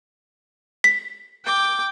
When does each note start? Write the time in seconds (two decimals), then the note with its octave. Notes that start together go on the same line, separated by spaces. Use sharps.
0.84 B6
1.45 G5 D6